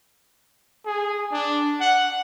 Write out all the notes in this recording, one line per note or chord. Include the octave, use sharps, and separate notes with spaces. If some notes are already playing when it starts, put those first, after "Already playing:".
G#4
D4
F#5